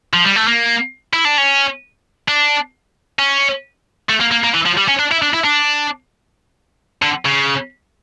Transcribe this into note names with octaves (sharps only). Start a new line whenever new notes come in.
F3
G3
A3
A#3
E4
D4
C#4
D4
C#4
A3
A#3
A#3
A#3
E3
F3
G3
C#4
D4
E4
D4
E4
D4
D3
C#3